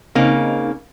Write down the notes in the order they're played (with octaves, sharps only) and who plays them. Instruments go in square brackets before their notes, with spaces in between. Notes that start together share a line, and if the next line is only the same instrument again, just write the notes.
[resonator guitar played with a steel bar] C#3 A#3 [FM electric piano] C4 D#4